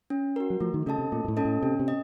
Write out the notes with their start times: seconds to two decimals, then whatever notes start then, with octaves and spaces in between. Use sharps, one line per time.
0.10 C#4
0.36 F#4 A#4
0.50 F#3
0.60 F3 A3
0.74 D#3
0.86 C#3 C#4 A4 D#5 A5
0.98 C3
1.12 A#2 A3
1.25 A#2
1.28 A2
1.37 C#4 A4 D#5 A5
1.45 A2
1.62 C3 C#4
1.79 C3
1.88 D#5